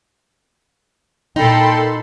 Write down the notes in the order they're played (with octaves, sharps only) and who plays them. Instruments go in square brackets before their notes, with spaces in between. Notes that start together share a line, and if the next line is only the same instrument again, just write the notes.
[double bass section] A#2 [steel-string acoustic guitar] D#4 [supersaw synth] A4 B5 C6 [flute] G5